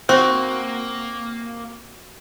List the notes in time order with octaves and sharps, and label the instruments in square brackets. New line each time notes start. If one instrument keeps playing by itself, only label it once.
[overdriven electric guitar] A#3 [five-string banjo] C4 [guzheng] F#4 [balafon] C5